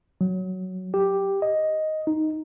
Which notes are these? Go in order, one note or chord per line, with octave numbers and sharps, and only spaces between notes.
F#3
G4
D#5
D#4